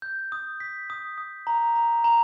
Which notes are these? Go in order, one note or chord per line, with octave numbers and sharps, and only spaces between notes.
G6
D#6
B6
D#6
D#6
A#5
A#5
A#5